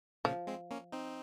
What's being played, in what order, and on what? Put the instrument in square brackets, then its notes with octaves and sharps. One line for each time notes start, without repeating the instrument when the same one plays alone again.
[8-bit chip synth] A#2 C#3 [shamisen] F3
[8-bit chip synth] G#3 C4
A#3 C#4
C4 D#4